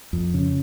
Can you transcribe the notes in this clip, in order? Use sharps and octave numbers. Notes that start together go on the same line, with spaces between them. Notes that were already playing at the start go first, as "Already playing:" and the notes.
F2
C#3